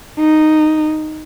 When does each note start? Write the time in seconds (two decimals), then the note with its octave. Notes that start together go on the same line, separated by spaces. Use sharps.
0.20 D#4